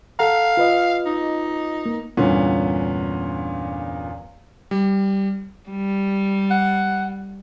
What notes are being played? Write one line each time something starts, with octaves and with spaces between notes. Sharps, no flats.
A4 F5 F#5 A#5
F4 B4 D#5
D#4
A#3
E2 G2 A#2 D3 B3 C#4
G3
G3
F#5